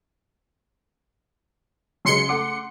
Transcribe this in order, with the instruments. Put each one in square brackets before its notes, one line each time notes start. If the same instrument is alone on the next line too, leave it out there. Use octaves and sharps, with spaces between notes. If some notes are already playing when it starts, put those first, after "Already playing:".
[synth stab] C#3 C6 C#7 [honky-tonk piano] F#3 G#3
[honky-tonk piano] A3 F#5 D6